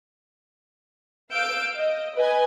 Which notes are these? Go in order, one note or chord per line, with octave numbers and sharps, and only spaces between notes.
F5 E6 G6 D7
D#5
B4 D#5 G#5